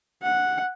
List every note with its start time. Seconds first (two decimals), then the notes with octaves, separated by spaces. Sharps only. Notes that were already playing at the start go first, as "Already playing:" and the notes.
0.23 F#5